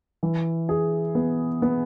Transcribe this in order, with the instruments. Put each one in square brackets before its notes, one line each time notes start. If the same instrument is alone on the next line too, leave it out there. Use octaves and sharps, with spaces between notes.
[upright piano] E3
G#4
B3
B3